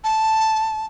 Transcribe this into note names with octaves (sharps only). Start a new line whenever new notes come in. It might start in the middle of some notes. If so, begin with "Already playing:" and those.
A5